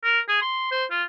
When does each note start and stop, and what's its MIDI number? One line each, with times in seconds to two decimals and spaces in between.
0.04 0.20 70
0.29 0.41 68
0.42 0.69 84
0.71 0.85 72
0.90 1.03 65